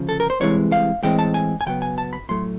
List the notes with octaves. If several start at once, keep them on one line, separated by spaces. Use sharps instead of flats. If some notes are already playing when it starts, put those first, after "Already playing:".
Already playing: D2 C#3 F3
A4
A#4
C5
C2 C3 E3 G#3 C#5
F5
A2 E3 G#3 C4 G5
A5
G#5
G#5
C#3 F#3 B3 G5
G#5
A5
B5
A2 F#3 A3 C6